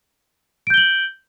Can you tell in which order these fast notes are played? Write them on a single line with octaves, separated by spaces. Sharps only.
D7 G6 G7 F#7